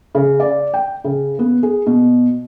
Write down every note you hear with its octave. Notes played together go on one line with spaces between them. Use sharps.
C#3
D5
G5
C#3
B3
G#4
B2